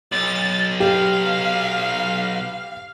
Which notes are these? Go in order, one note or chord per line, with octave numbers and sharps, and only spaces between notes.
B1 A6
G4 F5